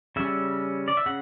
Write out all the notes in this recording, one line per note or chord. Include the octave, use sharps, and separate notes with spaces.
C#3 G3 C#4 E5
D5
E5
C#3 F#5